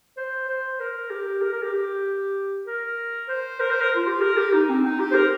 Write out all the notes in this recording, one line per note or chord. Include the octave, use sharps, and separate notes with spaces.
C5
C5
A#4
G4
A#4
A#4
G4
G4
A#4
C5
A#4
C5
A#4
F4
G4
A#4
G4
D#4
C4
D#4
G4
C5
A#4